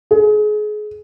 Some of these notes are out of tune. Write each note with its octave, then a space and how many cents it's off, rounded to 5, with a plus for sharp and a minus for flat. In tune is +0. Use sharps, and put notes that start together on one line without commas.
G#4 +30